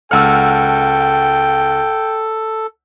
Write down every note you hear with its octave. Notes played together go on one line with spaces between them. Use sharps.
C#2 A4 F#5 G5 A5 E6 F6